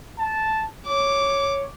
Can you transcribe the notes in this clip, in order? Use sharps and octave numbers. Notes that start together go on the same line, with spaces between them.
A5
C#5 D6